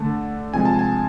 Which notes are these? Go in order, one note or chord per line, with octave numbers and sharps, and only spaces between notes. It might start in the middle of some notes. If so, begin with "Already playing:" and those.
Already playing: D3 A3 A5
C3 F3 G#3 G#5
A5
G#5